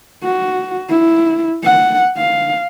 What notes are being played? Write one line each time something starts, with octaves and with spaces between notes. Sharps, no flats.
F#4
E4
F#5
F5